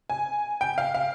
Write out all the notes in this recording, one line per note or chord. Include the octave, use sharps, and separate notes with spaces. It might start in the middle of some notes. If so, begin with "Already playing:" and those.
G#5
G5
F5
F5